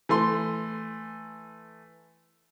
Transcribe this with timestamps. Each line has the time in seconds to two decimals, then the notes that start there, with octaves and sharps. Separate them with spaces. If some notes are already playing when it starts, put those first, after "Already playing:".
0.09 E3 A3 C6